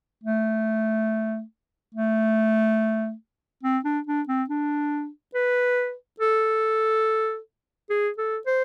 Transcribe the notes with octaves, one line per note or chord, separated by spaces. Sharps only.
A3
A3
C4
D4
D4
C4
D4
B4
A4
G#4
A4
C5